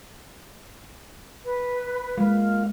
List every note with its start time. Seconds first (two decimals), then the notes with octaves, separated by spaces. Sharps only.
1.44 B4
2.18 G#3 A#3 F4 F5